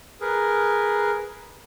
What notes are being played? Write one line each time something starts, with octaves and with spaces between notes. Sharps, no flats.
G#4 A#4 B4